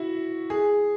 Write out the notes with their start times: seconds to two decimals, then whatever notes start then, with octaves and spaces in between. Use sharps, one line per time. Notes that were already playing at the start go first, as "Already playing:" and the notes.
Already playing: E4 F#4
0.50 G#4